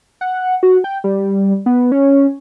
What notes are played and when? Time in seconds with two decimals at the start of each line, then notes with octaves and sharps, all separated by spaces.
0.21 F#5
0.63 F#4
0.84 G5
1.04 G3
1.66 B3
1.92 C#4